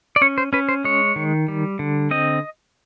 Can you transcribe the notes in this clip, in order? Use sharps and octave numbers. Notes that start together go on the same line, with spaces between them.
D5
C#4 C#5
C5
C#4 B4
C5
G#3 C#5
D#3
G3
D3
C4 D#5